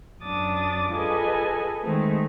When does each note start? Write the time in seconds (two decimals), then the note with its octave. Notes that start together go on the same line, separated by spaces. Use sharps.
0.23 F#2 D4 D6 D#6 A6
0.92 F4 G#4 A4 B4 D#5 G#5
1.83 D#3 G#3 A3 C4